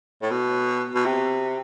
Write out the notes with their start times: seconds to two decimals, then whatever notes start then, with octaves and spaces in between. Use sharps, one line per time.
0.22 A2
0.31 B2
0.95 B2
1.05 C3